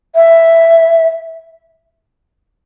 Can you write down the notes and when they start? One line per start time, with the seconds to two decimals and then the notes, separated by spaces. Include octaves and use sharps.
0.16 E5